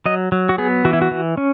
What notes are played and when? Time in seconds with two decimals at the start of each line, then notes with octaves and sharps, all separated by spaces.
0.06 F#3 D#5
0.32 F#3
0.49 F#4
0.58 B3 G#4
0.85 E3 F#4
0.93 E4
1.02 F#4
1.11 E3
1.37 C#4